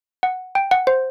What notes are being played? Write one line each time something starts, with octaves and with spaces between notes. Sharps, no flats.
F#5
G5
F#5
C5